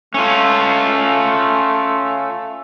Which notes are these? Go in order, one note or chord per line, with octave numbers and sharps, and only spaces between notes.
A3 C#4 F4